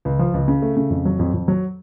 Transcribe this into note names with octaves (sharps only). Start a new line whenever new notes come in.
C#2
F3
C#2
C#3
A3
C#3
F2
F#3
F2
F2
F#3